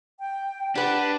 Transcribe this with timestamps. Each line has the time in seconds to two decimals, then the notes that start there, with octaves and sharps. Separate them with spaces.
0.20 G5
0.75 D4 G4 B4 F#5